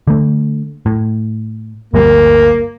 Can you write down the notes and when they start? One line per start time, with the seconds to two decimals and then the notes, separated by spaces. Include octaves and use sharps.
0.07 D3 A3
0.86 A2
1.94 G1 D2 G3 A#3